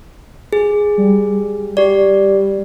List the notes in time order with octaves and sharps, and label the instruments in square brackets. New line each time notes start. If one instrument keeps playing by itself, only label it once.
[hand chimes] G#4
[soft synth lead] G3
[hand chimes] G4 D5